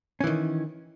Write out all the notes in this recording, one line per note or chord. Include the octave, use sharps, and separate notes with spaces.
D#3 E3 C#4